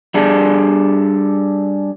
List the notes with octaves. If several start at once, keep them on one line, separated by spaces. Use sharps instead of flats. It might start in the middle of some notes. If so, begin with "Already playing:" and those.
G3 D4 G#4 A4